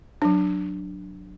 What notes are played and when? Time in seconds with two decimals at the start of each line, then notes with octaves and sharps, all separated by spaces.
0.22 F#3 D4